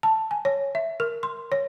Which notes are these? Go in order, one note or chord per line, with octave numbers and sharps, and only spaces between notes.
A5
G#5
C#5
E5
A#4
C6
C#5